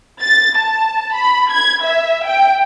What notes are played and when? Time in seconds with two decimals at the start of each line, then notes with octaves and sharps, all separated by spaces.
0.22 A6
0.58 A5
1.16 B5
1.52 G#6
1.85 E5
2.26 G5